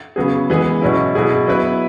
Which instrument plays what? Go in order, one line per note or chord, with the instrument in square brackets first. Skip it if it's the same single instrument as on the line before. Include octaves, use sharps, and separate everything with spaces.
[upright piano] C#3 F#3 B3 G#4
E3 G#3 B3 G#4
B2 F#3 C#4 E4
B2 F#3 E4 G#4
F#3 B3 E4 B4